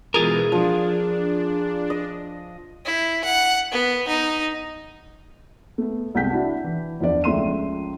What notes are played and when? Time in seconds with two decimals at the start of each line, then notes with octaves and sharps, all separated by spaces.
0.14 B2 E3 G#3 F4 G#4 A#4
0.52 F3 D4
1.90 D#5
2.85 E4
3.24 F#5
3.71 B3
4.08 D#4
5.78 A3 B3
6.15 C2 G#3 G5 G6 B6
6.29 D4 E4 F#4 F#5 A5
6.64 E3
7.00 E2 F3 D4 D5
7.24 C#2 F3 A3 E5 C6 D#7